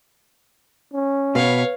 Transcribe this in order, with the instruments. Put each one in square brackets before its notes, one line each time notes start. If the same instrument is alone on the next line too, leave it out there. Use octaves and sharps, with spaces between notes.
[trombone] C#4
[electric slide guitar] B2 [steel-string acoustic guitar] B4 [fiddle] C#5 F5